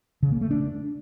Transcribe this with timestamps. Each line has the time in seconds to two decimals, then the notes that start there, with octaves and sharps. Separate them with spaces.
0.23 C#3
0.32 A#3
0.41 A3
0.51 D4